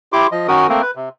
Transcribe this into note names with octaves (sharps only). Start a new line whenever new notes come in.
E4 G4 C6 D6
F3 D#5
D#3 C#4 F#4 A#4 D#6
A3 A#3 C4 A#4
B4
C3